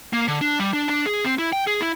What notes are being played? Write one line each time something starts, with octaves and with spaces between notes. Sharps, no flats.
A#3
D3
D4
G3
D4
D4
G#4
C4
E4
G5
G#4
E4